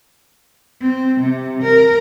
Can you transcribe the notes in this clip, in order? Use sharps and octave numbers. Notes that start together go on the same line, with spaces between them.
C4
C3
A#4